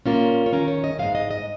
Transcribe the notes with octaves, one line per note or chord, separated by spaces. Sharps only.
A#2 A#3 C#4 F4
C#5
D#3 C#4 A#4
C#5
D#5
G#2 F3 G#3 F5
D#5
D#5